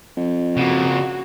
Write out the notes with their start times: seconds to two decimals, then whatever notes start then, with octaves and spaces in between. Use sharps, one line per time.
0.17 F2
0.57 C#3 A#3 F#4